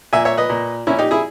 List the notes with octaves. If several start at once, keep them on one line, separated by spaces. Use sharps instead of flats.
A#2 E5 G#5
C#5 E5
B4 D#5
A#2
A#2 C#4 E4
D#4 G4
E4 G#4